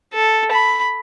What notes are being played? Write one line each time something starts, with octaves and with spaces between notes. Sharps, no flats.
A4
B5